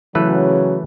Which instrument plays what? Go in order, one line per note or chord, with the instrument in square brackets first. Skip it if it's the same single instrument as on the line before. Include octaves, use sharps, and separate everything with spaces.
[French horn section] C#3 F#3 [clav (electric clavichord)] E3 A3 B4